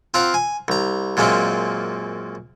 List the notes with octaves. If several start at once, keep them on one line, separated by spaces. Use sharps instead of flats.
C4 F4 F5 F#5 A#5
G#5
C2 A#5
F#2 A#2 G#3 A#3 C4